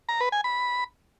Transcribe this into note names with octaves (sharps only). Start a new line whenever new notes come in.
A#5
B4
G#5
B5